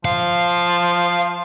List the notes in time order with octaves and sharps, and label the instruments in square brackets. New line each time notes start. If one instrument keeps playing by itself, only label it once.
[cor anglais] F3 [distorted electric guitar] F5